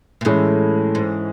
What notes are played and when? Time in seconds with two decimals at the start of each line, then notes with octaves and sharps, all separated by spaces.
0.21 A#2
0.25 A2 E3 G#3 C#4
0.95 G#2